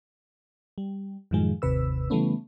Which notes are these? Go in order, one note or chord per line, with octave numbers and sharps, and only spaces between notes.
G3
F#2 A2 D#3 F3 G#3
G1 D#2 C3 B4 E6
C#3 E3 G3 A3 B3 C#4